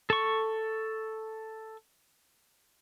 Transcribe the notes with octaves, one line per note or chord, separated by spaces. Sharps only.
A4 C#6